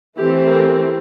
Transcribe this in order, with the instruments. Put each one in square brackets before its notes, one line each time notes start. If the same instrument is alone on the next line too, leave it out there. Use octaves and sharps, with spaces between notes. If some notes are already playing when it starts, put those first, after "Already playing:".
[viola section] E3 A3 C4 E4 G4
G4 A#4